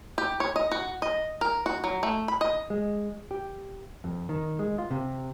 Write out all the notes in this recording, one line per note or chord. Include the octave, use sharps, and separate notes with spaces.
G4
C#5
D#5
F#4
D#5
A#4
F#4
F#3
A3
B5
D#5
G#3
G4
F2
D#3
G#3
F4
C3